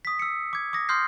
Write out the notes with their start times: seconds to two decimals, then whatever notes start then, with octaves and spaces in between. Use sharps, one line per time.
0.05 D#6 B6
0.19 E6 C#7
0.53 D6 G#6
0.73 D6 D#6 A#6
0.89 C6 D#6 F6 G6 C7